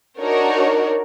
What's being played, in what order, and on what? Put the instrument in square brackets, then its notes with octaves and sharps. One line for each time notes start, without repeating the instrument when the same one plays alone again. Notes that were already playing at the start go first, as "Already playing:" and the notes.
[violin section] D4 D#4 F#4 A#4 C#5